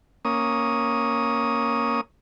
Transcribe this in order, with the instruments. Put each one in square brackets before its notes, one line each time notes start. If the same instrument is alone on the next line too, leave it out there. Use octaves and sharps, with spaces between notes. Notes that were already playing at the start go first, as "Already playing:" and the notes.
[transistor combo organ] A#3 C#4 D#6